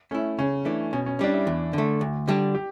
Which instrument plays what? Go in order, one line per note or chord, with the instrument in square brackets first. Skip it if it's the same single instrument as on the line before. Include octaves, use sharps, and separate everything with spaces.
[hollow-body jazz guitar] A3 E4 [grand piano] C#4
[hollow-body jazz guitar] C#3 [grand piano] C#4
[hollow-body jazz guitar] E3 A3 D4
[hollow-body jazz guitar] B2 [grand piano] C#4
[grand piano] C#4
[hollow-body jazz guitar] G3 C#4 [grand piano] D4
[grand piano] E4
[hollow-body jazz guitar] E2
D3 A3
D2
D3 G3 D4
[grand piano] G4